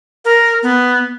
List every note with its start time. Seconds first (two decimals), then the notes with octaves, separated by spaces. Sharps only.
0.25 A#4
0.63 B3